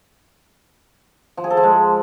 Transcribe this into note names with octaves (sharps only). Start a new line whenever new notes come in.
F3
G#4
A4
F3
G#3